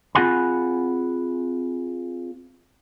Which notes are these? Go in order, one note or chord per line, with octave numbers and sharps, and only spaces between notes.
C4 F4 G#4 F#5 G#5 B5